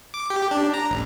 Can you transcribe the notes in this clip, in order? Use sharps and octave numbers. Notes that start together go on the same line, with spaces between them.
D6
G4
D4
A#5
A1